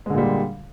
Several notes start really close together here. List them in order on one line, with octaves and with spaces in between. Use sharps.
G#3 D3 A#2 G3